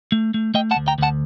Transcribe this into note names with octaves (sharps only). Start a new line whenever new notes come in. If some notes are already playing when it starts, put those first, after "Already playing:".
A3
A3
A3 D#5 G5
F#5 A5
D2
G5 A#5
D2 F#5 A5